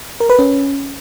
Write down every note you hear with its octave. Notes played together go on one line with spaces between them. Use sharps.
A#4
B4
C#4